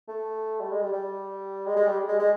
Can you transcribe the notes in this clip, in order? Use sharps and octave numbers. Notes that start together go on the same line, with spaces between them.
A3
G3
G#3
G3
G3
G#3
G#3
G3
G#3
G#3